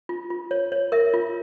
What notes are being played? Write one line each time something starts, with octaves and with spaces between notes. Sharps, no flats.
F4
F4
C#5
C#5
A#4 E5
F4